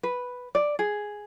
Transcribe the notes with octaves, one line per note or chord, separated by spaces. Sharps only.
B4
D5
G#4